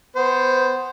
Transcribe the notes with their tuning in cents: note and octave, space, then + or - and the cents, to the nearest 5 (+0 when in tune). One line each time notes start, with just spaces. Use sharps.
B3 +20 C5 +0